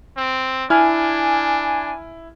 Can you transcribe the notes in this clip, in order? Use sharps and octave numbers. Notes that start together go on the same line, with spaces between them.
C4
D4 E4 G#5 F6